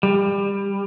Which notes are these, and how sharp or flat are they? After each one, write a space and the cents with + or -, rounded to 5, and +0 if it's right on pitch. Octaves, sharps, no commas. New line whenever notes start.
G3 +25